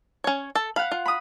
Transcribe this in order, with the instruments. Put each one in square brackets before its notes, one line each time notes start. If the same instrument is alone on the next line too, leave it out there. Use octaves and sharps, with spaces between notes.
[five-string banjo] C#4 C#5
A4
[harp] F5 F#5 [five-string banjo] B5
[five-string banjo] F4
[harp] B5 D#6